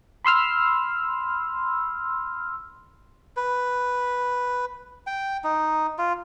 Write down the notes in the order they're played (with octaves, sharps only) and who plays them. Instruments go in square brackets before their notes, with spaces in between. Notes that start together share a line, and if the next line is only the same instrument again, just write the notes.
[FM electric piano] B5 C6 E6 F6
[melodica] B4
G5
D#4
F4